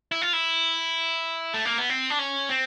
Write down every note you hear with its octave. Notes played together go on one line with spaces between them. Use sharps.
E4
F4
E4
A3
A#3
B3
C4
D4
C#4
C4